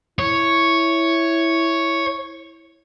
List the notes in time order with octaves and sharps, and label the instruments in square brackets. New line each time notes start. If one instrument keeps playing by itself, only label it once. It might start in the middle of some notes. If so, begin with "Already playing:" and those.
[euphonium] E4 [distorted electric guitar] C#5